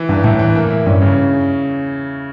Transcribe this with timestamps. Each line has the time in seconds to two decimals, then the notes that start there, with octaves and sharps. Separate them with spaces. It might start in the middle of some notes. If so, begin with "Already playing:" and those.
Already playing: E3
0.09 E2 G2
0.24 A2 E3
0.39 E3
0.55 A#3
0.70 E4
0.86 G2 C#4
1.02 C#3